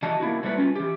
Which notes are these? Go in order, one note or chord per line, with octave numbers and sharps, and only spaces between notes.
E3 F#4 D#5 A5
A#3 E4 F#4
F#3 G3 A3 F#4 B4
C#4 F4
E3 G4